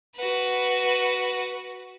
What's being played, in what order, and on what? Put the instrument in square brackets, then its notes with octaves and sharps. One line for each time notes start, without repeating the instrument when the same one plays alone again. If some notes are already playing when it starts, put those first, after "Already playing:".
[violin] F#4 B4